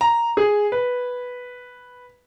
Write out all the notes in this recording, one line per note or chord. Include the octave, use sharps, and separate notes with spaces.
A#5
G#4
B4